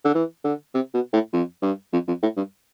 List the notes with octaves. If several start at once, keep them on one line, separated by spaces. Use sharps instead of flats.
D3
E3
D3
C3
B2
A2
F2
G2
F2
F2
A2
G2